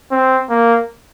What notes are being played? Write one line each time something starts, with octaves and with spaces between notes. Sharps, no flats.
C4
A#3